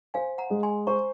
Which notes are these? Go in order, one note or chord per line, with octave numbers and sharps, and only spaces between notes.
C5 F5 G#5
F#5 A#5
G#3
G#5 C6
C5 A#5 C#6